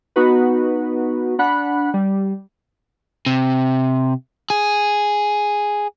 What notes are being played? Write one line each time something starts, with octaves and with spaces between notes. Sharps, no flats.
B3 D#4 F#4 B4
D4 F#5 B5 F#6
G3
C3
G#4